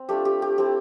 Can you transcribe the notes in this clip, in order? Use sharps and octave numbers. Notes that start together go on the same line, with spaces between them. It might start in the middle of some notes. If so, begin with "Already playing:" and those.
Already playing: C4
A3 D4 F4 G4
G4
G4
A3 C4 E4 G4